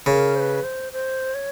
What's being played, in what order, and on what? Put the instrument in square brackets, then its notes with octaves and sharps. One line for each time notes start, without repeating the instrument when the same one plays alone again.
[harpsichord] C#3 [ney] A#4
[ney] C5
B4
C5
C5
C#5